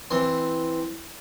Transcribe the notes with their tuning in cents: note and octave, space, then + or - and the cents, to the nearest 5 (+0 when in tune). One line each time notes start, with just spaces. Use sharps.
E3 +0 C4 +0 C6 +0